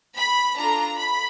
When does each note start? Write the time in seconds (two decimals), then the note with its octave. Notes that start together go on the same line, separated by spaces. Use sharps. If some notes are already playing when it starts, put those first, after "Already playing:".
0.16 B5
0.56 D4 F4 A4 A#5
0.98 B5